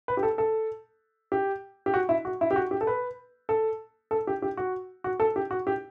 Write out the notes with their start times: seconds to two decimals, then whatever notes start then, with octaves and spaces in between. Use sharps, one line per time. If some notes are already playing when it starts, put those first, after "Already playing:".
0.08 B4
0.17 G4
0.23 A4
0.38 A4
1.32 G4
1.86 G4
1.94 F#4
2.09 E4
2.25 F#4
2.41 E4
2.51 G4
2.56 F#4
2.71 G4
2.81 A4
2.87 B4
3.49 A4
4.11 A4
4.27 G4
4.42 G4
4.57 F#4
5.04 F#4
5.20 A4
5.36 G4
5.51 F#4
5.67 G4